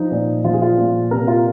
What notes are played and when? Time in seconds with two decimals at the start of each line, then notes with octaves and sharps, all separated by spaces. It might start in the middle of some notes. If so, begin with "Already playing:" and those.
Already playing: F3 D#4
0.11 A#2
0.44 F3 F4
0.53 G#4
0.62 F4
0.78 A#2
1.11 C3 A#4
1.27 F4